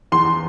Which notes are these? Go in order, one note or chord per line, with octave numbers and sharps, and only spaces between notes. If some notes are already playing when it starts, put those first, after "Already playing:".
E2 C6